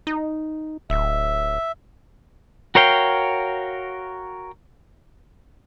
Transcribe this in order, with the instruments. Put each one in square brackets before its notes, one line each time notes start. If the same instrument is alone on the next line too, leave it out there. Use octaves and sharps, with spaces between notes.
[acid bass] D#4
[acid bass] D1 [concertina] E5
[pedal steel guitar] F#4 A#4 C#5 F5 G5